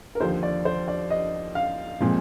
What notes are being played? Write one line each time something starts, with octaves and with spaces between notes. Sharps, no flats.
A#4
D#2 D3 F3 C5
D5
C5
D5
D#5
F5
A#2 F3 G#3 C4